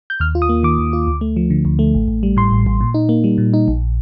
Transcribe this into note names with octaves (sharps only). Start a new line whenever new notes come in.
G6
D#2 F6
F4
D#6
A#3
D#3 D6
D#2
F4
D2
A3
F3
D3
D2
A3
A1
A1
G3
A2 C6
A1
A1
A#2
D#4
A#3
G3
A#2
D#4
A#1